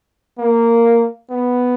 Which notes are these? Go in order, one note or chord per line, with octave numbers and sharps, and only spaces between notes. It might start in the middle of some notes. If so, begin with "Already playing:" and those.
A#3
B3